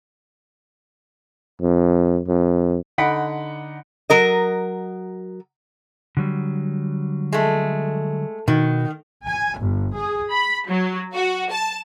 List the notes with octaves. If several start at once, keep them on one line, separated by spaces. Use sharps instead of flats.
F2
F2
D3 D#4 F#5 B5 B6 D7
F#3 A#4 D#5
D3 F#3 G3
G#3 A3
B2 D#3 F#4
G#5
G1
G#4
B5
F#3
F#4
A5